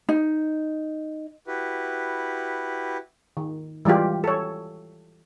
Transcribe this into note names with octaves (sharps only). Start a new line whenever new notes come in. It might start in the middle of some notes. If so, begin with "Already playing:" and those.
D#4
E4 F#4 G4 B4
D#3
E3 G3 G#3 F4 G4
A4 C#5